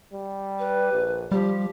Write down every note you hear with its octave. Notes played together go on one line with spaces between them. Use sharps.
G3
B4
A#1
F3 G3 G4